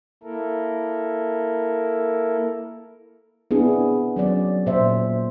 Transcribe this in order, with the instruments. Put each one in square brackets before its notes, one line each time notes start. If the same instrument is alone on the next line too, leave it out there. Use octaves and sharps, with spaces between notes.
[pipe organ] A#3 E4 A4 A#4
[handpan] B3 C4 D4 E4 G#4
F#3 C#4 D5
A#2 C5 E5